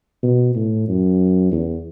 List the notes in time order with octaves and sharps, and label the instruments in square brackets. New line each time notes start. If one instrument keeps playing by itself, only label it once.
[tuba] B2
A2
F#2
E2